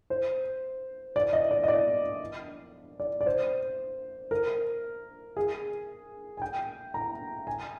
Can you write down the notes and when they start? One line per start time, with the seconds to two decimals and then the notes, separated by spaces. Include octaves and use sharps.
0.10 C5
1.16 D5
1.33 D#5
1.51 D5
1.63 D#5
1.68 D5
3.00 D5
3.21 D5
3.26 C5
4.31 A#4
5.37 G#4
6.37 G#5
6.42 G5
6.94 A#5
7.47 G#5